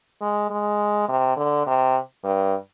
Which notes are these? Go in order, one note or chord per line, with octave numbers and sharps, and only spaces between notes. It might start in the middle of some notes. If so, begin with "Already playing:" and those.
G#3
G#3
C3
D3
C3
G2